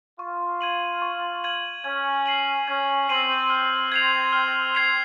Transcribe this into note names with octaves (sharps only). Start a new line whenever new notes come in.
F4 C#6
G#6 D#7 F#7
C#6
G#6 D#7 F#7
C#4 G#6
C7 D#7 F#7
C#4 G#6
C4 C7 D#7 F#7
F6
G#6 C7 F7
F6
G#6 C7 F7